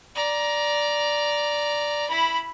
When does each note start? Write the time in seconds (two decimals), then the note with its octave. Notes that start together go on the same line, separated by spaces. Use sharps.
0.15 D5 A#5
2.08 E4 B5